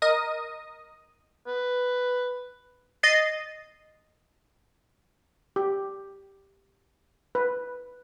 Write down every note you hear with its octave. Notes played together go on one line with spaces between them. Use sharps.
A#4 D#5 D#6
B4
D#5 A6 C7
G4
B4